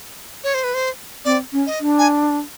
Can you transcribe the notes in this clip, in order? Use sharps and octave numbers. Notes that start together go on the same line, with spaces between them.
C#5
C5
B4
C5
C4 D5
C#4
D#5
D4
G#5